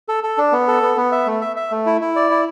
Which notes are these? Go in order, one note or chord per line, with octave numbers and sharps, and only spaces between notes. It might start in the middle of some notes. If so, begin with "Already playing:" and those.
A4
A4
D4
B3
A4
B3
B3
E5
A3
E5
E5
A3
E4
E4
D5
E4